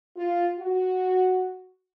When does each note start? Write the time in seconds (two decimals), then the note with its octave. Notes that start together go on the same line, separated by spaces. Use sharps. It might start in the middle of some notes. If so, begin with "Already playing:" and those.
0.16 F4
0.58 F#4